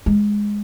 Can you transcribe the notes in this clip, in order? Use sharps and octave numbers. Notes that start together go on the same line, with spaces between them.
G#3